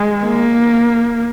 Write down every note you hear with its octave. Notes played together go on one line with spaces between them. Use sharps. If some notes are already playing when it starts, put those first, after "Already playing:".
Already playing: G#3
A#3